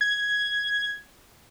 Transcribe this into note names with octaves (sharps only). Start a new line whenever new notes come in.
G#6